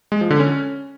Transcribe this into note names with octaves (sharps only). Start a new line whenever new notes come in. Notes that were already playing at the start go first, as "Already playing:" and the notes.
G#3
F3
D3
C#4